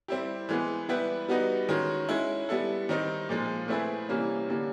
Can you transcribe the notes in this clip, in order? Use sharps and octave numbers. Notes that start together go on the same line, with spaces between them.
G3 C4 E4 G4
E3 G#3 B3
G3 B3 E4 G4 B4
G3 B3 D#4 F#4 B4
D#3 G#3 C#4 F#4
G#3 C#4 E4
G3 B3 E4 A4
D#3 G3 C4 D#4
A#2 F3 G#3
A3 C4 E4 G#4 B4
C3 E3 G3 A#3 C#4
D3 G3 A#3 C#4